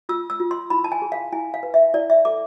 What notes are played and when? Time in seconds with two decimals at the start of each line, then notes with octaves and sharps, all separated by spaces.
0.09 F4 E6
0.30 E6
0.40 F4
0.51 C6
0.70 E4 B5
0.84 A5
0.92 G#5
1.02 G#4
1.12 F5
1.32 E4 G#5
1.54 F5
1.63 B4
1.74 E5
1.94 E4 D5
2.10 E5
2.25 A4 D6